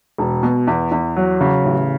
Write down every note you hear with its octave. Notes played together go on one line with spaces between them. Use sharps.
E1
B2
E2
E2
F#3
C#3
A1